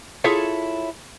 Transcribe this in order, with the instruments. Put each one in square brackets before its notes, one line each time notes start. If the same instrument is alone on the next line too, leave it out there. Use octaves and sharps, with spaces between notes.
[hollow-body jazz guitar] E4 F4 G#4 A4 C#5 E5